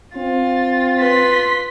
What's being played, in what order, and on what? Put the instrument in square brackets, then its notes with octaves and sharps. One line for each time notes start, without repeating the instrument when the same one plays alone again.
[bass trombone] C4 [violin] F4 A6
[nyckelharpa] B4 [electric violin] C6 B6